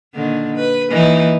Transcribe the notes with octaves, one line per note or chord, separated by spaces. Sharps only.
A#2 D3 D#3
B4
E3 A#3 D#4